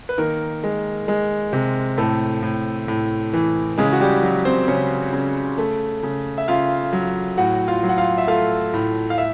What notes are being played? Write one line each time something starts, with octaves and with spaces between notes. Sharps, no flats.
B4
D#3 A#3 A#4
G#3
G#3
C3
A2 A3 A4
A2
A2
E3
C#3 G#3 G#4
F#4
G3 G4
F#3
C4 C5
C#3 C#4 C#5
C#3
A3
C#3
E5
C#3 F4 F5
F#3
A2 F#4 F#5
F4 F5
F#3
F#5
F4 F5
E5
A3 F4 F5
A2
F5
E5